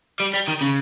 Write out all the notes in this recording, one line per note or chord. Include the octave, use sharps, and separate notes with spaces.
G3
G3
D#3
C#3